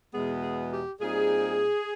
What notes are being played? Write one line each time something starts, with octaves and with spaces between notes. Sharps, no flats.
E2 B2 G#3 B3 G#4
G#4
G4
A#2 G3 C4 D#4 G#4